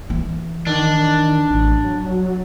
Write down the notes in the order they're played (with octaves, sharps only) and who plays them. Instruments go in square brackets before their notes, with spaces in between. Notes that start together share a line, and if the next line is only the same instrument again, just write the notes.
[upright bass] E3
[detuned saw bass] D#3 [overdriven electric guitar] D4
[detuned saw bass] A1
F#3